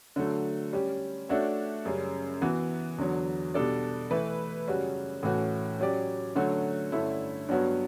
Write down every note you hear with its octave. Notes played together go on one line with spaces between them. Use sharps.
D3 F#3 A3
G3 C#4 G4
A3 D4 F#4 C#5 E5
F#2 C#3 G3 C#4
E3 B3 F#4
E2 D3 F#3
B2 G3 D4 A4 D5
E3 A3 E4 B4
F#2 C#3 G3 C#4 F#4
A2 E3 A3 C#4 F#4
F#3 C#4 G4 D5
D3 F#3 A3 C#4 F#4
G2 D3 A3 C#4 E4
G2 F#3 B3 F#4 C#5